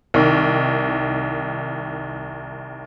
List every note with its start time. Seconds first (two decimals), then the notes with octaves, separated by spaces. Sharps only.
0.14 C2 D#3